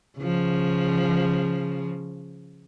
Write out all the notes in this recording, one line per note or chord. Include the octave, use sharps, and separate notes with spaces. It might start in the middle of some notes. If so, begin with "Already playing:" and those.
C#3 F3